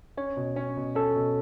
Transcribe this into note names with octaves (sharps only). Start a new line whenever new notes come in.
C#4 C#5
B2
C#4
B2
C#4 A4
B2